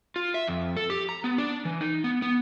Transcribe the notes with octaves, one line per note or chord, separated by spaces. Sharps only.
F4
E5
F2
A4
G4
A#5
B3
D4
E3
D#4
B3
B3